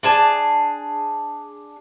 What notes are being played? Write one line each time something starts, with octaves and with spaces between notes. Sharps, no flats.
D4 G#4 A5